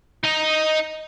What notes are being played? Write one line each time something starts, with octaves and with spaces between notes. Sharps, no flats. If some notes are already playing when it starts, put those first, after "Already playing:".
D#4 D#5